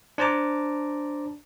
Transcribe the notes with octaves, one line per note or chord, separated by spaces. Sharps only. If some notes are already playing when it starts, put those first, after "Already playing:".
D4 C5 A5 A#5 D6